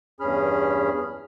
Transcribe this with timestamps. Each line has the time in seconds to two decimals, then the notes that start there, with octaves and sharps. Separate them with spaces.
0.20 E2 G2 C#4 G#4 B5 F6